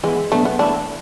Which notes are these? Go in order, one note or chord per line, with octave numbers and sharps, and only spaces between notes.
E3 G#3 B3 E4
B2 F#3 A3 B3 D4
B3
E3 A3 D4 E4